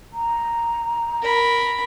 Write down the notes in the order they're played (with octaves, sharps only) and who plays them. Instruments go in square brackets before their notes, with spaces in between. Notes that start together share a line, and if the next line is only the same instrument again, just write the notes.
[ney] A#5
[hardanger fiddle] A#4 B5